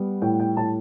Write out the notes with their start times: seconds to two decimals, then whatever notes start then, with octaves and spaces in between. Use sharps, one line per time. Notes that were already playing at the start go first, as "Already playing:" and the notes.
Already playing: G3 B3
0.22 A2 G5
0.40 G5
0.57 A2 A5